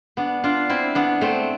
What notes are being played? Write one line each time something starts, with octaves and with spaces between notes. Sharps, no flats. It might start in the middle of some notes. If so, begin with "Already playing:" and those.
B3 D4
D4 F4
C4 E4
B3 D4
A3 C4